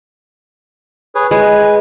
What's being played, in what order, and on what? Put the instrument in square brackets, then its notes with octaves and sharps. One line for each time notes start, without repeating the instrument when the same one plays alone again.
[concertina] G#4 B4 C#5
[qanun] G#3 [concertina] B4 G#5